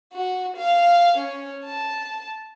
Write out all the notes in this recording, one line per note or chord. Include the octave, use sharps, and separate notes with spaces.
F#4
F5
C#4
A5